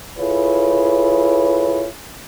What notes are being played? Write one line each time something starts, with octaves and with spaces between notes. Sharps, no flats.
E4 F4 G#4 A4 B4 C#5